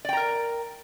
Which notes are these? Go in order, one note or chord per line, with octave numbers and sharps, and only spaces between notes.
A#4 D5 G5 A#5